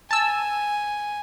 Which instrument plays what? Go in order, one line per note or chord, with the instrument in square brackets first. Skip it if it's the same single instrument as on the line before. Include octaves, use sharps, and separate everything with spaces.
[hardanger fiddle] G#5 [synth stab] A5 E6